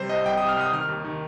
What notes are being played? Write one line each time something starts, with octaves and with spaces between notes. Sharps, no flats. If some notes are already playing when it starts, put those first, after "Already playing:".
Already playing: C3 G3 C5
C2 D#5
C2 G5
C3 D#6
F6
C2 D#6
D#3 F6
D#2
D#3